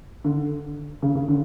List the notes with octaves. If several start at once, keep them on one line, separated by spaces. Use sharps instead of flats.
D3
C#3
C#3
D3